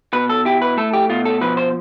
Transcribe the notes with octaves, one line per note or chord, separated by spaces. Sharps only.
B2 B4
A4
E4 G4
B4
A3 A4
G4
B2 F4
A4
F3 B4
C5